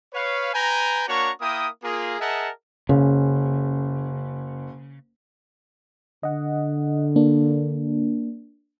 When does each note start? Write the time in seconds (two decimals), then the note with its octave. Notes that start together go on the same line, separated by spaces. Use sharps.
0.14 B4 C#5 F5
0.54 B4 G5 G#5 A#5
1.08 A#3 D4 F#4 C#5 A#5 C#6
1.41 A#3 E4 A#4 G5 D#6
1.84 A#3 F4 G#4
2.20 G#4 A#4 D#5 E5 F#5 A5
2.89 F#1 C#3
6.23 D3 D#5 F#5
7.16 A#3 D4